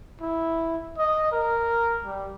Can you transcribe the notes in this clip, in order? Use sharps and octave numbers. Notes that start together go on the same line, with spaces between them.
E4
D#5
A#4
G3